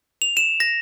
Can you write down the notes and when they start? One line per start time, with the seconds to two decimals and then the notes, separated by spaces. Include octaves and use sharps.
0.22 F7
0.37 E7
0.60 A#6